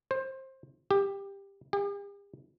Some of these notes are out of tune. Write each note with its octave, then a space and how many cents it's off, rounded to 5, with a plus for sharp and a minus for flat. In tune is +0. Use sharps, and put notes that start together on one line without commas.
C5 +20
G4 +15
G4 +45